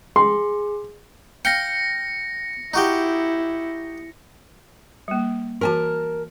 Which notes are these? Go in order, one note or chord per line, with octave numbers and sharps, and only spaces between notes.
G#4 C6
F5 G5 A#6 C#7
D#4 E4 F#4 G4
G3 A#3
E3 F#4 A#4 G#5 A5